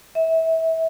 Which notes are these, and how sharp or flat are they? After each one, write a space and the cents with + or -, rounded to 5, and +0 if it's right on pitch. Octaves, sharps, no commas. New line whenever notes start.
E5 -25